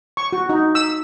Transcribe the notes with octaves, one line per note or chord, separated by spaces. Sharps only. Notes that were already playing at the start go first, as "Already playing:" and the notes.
C#6
F#4
D#4
E6